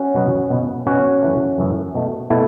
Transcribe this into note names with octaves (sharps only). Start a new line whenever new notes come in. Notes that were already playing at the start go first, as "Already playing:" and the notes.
Already playing: C#4 F#4
B2 F#3 B3
B2 B3
B2 B3 C#4 F#4
F#2 E3 A3
F#2 E3 A3
B2 A3
B2 A3 E4 A4